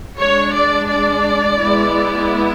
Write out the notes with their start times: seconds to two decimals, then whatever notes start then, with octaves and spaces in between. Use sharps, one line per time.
0.18 G#3 D4 C#5
0.54 D5
0.89 D5
1.61 G#3 B3 E4